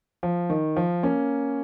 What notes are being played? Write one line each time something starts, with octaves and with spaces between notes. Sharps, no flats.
F3
D#3
F3
A#3 C#4